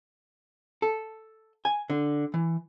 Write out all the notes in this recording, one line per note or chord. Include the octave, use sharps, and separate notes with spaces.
A4
G#5
D3
E3